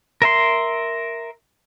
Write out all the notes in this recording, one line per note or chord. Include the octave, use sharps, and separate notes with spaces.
A#4 E5 C6